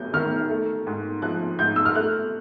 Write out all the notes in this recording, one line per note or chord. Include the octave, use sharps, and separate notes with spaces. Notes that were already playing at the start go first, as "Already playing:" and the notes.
Already playing: F#3 G6
D#3 F6
A3
G#2
F3 F#6
G#2 G6
E6
F6
A3 F#6